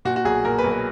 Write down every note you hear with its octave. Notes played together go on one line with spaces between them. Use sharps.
A#2 F#4
F#4
B1 G#4
A#2 A#4
B4
B1
B4